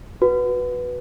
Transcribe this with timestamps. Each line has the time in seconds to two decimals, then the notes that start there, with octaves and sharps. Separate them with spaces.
0.22 F#4 B4